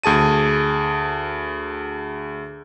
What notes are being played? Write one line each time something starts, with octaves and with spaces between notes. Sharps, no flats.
D2 G#4 A5 D#7